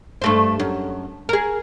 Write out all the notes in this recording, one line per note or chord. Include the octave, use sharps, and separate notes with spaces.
G2 A3 C5
F#2
G#4 A#4